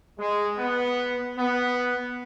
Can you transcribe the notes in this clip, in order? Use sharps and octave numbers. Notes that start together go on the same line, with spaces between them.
G#3
B3
B3